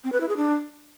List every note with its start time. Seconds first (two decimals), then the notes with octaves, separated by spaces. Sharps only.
0.04 C4
0.12 B4
0.20 E4
0.29 G#4
0.37 D4